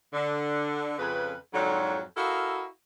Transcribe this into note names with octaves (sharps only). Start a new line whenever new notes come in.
D3
F2 C#3 B4
F2 G#2 D3 F#3
E4 F#4 A4 A#4 D#5 F5